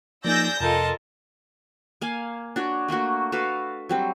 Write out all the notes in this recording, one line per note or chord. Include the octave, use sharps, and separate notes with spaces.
F3 A#3 D#4 G#4 D5 E6 G6 A#6
F2 C3 F4 A4 A#4 D#5 A5
A#3 F5 G#5
D4 F#4 C#5
A3 A#3 D4 F#4
F#4 A4 B4 F5
F#3 G3 C4